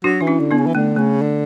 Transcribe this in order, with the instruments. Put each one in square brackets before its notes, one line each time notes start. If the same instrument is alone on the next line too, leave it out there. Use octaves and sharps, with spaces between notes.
[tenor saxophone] F#3 [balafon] D4 F#4
[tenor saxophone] E3 [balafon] D4
[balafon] C#4 E4
[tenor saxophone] D3
[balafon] B3 D4
[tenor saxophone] C#3
E3
[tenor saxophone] D3 [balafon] A3
[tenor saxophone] C#3 [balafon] A3
[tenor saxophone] D3